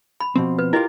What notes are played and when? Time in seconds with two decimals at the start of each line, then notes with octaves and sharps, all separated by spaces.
0.20 B5
0.36 B2 F3 C4
0.59 B4
0.73 E4 F4 G4 A#4 D#5